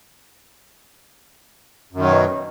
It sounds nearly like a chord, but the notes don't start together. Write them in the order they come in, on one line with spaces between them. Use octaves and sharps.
F#2 D#3 F#3 B2